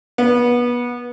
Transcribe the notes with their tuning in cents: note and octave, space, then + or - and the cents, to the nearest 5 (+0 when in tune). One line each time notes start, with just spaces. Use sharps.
B3 -25